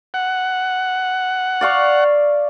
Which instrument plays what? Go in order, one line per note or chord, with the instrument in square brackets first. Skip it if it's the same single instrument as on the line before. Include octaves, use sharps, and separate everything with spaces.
[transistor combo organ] F#5
[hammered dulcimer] D5 F5 C#6